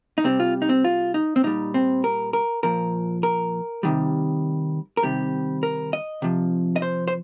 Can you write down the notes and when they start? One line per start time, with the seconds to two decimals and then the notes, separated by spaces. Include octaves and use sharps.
0.18 D#4
0.24 C3 G3 C4
0.40 F4
0.62 D#4
0.69 C4
0.84 F4
1.14 D#4
1.36 C4
1.44 A#2 G3 D#4
1.74 C4
2.04 A#4
2.33 A#4
2.63 A#2 F3 A#4
3.23 A#4
3.83 C3 D#3 G3
4.97 A#4
5.03 C3 D#3 G3 G4
5.63 A#4
5.93 D#5
6.22 C3 F3
6.76 D#5
6.82 C5
7.08 C5